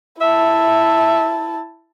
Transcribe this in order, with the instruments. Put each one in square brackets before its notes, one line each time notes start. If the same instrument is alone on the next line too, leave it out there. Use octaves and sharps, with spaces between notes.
[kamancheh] E4 A5 [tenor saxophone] E5